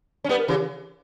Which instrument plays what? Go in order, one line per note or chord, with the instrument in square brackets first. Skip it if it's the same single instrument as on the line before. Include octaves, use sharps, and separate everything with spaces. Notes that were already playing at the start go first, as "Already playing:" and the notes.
[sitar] C#4
[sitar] G3 B3 [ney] B4
[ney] A#4
[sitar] C#3 E3 [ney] G4